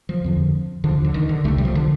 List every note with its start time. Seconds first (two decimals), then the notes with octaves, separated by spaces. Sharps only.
0.09 F3
0.24 F2 D3
0.84 D3 F3
0.89 D2
1.04 D3
1.14 D#3
1.29 D3
1.44 C2 A3
1.48 C3
1.58 G3
1.65 F3
1.75 D3